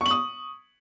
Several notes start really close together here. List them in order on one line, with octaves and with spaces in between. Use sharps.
C#6 F#7 D#6